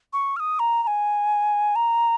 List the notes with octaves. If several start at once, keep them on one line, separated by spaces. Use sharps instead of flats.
C#6
F6
D#6
A#5
A#5
G#5
A#5